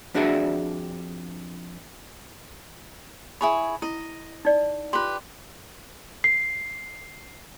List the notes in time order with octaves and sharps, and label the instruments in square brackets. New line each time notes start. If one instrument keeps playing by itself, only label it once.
[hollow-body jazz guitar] F2 D4 F#4 G#4 D5 E5
[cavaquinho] E4 G#4 C#5 [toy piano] B5
[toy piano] E4 [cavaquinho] D#5
[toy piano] D#4 D5
[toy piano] F4 C6 [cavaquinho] G4 B4
[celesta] C7